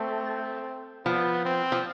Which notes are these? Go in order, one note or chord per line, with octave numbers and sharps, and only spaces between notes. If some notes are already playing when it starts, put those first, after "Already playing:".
Already playing: A3 C4
F3 B3
C4
F3